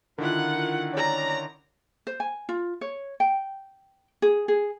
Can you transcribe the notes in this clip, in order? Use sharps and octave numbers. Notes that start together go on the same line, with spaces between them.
D3 D#3 E4 F4 A#4 F#5
C#4 D5 A#5
C5
G#5
F4
C#5
G5
G#4
G#4